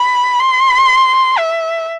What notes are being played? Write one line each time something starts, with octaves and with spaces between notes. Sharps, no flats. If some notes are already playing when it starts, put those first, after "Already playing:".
Already playing: B5
C6
E5